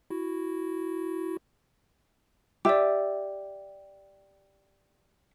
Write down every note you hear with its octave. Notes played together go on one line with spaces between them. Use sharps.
E4 F#4
G4 D5 E5 D6